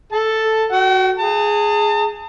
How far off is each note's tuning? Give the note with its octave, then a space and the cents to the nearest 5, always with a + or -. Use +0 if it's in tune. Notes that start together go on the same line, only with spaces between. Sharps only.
A4 +0 A5 +0
F#4 +0 G5 -45
G#4 +0 A5 +40